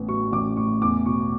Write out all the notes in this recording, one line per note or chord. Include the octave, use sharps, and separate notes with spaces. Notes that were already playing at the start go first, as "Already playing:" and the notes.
Already playing: A1 A2 B3
F#3 C#6
A1 D6
A2 C#6
E2 D6
B2 C#6